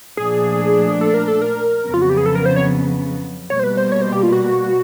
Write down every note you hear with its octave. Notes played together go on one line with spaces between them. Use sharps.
A#2 F3 A3 D4 G#4
A4
A#4
A4
A#4
F2 C#3 F#3 B3
F4
F#4
G4
G#4
A4
A#4
C5
C#5
B2 G3 A#3 C#5
C5
B4
C5
C#5
C5
G4
F4
F#4